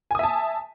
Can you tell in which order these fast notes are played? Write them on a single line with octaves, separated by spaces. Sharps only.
G#5 D#6 E5 A5